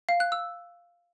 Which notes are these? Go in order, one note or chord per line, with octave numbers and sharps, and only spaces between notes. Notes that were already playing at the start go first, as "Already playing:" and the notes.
F5
F#6
E6